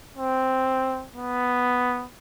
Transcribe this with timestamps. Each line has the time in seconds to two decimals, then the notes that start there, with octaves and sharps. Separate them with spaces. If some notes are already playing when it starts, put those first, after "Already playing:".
0.16 C4
1.16 B3